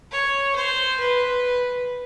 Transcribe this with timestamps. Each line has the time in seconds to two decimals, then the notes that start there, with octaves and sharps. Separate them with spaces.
0.11 C#5
0.55 C5
1.00 B4